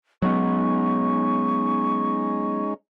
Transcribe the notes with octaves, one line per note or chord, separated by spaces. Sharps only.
F#3 G#3 B3 C#4 D#4 C#6